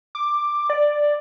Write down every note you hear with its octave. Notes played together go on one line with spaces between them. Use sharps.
D6
D5